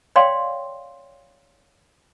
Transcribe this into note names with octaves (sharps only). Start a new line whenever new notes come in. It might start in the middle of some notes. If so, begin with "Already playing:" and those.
C#5 D5 F5 G5 C6